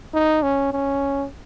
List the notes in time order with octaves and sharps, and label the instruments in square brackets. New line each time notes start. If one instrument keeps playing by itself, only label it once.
[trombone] D#4
C#4
C#4